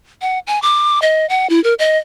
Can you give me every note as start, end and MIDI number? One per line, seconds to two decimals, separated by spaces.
0.21 0.39 78
0.47 0.61 80
0.62 1.01 86
1.02 1.28 75
1.29 1.49 78
1.50 1.62 64
1.64 1.74 70
1.79 1.98 75